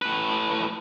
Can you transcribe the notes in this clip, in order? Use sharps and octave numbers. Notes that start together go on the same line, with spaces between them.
A2 B4